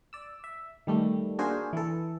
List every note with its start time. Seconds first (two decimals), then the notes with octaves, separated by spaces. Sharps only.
0.13 D5 E6
0.44 E5
0.87 D#3 G3 A3
1.39 A#3 D4 F#4 G#4 A#4 C5
1.73 E3 A4